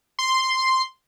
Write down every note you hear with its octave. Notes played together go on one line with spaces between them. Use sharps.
C6